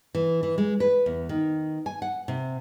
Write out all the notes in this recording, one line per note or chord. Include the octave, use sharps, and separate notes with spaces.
E3
E3
G#3
B4
E2
D#3
G#5
F#5
C3